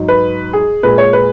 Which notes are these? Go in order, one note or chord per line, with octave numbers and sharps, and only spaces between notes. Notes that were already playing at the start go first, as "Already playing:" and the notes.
Already playing: G#2 F#3
B4
G#4
A#2 G#3 B4
C#5
B4